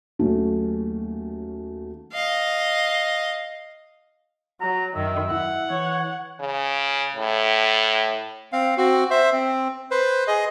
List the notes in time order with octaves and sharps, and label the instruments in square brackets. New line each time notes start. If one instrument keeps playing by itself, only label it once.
[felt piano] D#2 F#3 A3 C#4
[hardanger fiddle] D#5 F5
[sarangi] F#3 [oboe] A#5
[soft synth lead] F#2 [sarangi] D#3 [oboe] E5
[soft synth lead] E4 [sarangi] F#5
[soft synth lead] E3 [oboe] C#5
[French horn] C#3
A2
[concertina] C4 F5
C4 F#4
C5 E5
C4
B4 C5
G#4 D#5